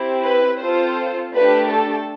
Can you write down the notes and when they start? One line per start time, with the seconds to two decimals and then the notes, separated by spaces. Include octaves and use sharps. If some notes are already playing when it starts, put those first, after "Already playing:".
Already playing: C4 E4 G4
0.24 B4
0.59 C4 F4 A4 C5
1.33 A3 D4 G4 B4
1.70 A4